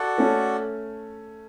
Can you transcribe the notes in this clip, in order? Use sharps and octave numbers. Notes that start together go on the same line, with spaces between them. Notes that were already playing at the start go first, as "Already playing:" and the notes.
Already playing: F#4 A4 D5 F#5
A3 C#4